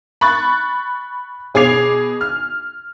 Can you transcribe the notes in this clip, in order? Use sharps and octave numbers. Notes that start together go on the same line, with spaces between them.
B5 C#6 F#6 A6
B2 G#4 D6 G#6 C7 F7
F6